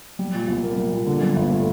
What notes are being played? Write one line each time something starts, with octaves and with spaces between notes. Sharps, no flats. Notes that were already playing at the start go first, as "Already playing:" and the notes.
G3
A#2
C2
A#3
G3
A#2
D3
G2
G1
A3